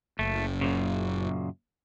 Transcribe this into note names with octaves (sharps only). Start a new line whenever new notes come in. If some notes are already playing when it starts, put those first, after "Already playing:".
F#1 A3
F#2 A#2 C#3